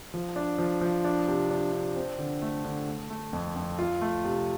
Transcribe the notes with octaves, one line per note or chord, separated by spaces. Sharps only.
F3
D4
F3
F3
D4
C3
D4
D4
C4
D3
A3
D3
A3
A3
F2
F2
F4
A3
C3